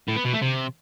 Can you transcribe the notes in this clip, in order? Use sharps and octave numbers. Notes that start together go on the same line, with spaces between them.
A2
B3
B2
A3
C3